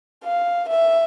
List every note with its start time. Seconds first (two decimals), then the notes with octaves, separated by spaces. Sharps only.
0.24 F5
0.69 E5